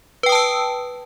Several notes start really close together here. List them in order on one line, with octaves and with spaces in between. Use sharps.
B4 G5 D#6 A5 E6